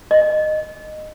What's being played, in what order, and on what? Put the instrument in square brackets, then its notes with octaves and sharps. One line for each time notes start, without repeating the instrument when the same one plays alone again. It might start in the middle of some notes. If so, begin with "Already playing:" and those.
[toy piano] D#5